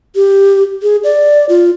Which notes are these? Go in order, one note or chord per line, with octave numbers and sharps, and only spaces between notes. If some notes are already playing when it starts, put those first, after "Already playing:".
G4
G#4
D5
F4